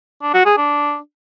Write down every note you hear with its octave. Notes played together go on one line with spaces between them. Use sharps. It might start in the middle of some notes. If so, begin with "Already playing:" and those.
D4
F#4
G#4
D4